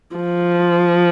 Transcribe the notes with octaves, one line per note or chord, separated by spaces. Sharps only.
F3